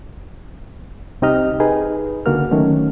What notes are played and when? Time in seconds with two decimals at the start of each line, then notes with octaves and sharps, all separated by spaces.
1.22 C2 C4 D#4 G4 D#5 F6
1.60 D#4 G#4 B4
2.26 C#2 D3 A#3 F#4 A#4 F6
2.51 D#3 F#3 A3 C#4